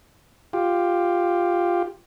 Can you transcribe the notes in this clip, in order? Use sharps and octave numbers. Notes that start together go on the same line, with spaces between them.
F4 G4